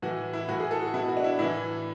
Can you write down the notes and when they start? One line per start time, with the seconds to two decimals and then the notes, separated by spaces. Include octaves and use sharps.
0.02 A2 E3 F#4
0.33 E4
0.48 A2 F#4
0.52 E3
0.60 G#4
0.71 A4
0.82 F#4
0.94 B2 E4
1.08 F#4
1.17 D4
1.24 E4
1.39 A2 E3 E4